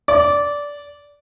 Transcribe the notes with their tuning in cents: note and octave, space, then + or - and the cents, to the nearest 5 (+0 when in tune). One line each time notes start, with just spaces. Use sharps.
D5 -15